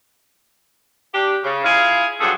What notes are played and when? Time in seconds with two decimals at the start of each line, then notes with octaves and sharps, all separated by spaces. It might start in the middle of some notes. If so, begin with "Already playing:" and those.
1.15 D4 G4
1.44 C#3
1.65 E4 F4 G#4 F5
2.21 G2 F3 F#3 G#4 A4